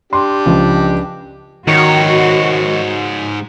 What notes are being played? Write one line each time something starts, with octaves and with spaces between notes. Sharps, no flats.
D4 G4 C6
C#2 F3
G#2 D#3 F#4 C#5